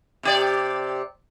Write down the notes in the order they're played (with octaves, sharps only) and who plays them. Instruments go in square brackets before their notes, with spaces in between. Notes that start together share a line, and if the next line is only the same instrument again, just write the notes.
[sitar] C3 G4 D5